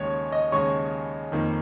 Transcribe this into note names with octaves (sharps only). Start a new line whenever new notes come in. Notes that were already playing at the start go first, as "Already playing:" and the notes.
Already playing: D#2 C#3 G#3 C#5 C#6
D#5 D#6
D#2 C#3 G#3 C#5 C#6
F2 D#3 A#3